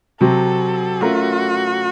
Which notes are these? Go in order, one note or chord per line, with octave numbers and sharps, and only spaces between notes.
C3 F#3 C4 F#4 A4
A3 C#4 F4 F#4 A#4